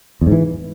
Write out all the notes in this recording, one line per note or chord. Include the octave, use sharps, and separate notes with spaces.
E2
G#2
E3